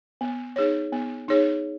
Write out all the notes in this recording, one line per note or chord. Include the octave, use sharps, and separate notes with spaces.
B3
D#4 G#4 C#5
B3
D#4 G#4 C#5